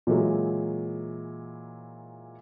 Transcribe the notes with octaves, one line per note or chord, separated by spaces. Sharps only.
A#2 E3 F#3 G#3